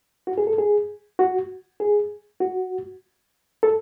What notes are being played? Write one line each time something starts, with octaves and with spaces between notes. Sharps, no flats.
F#4
G#4
A4
G#4
F#4
G#4
F#4
A4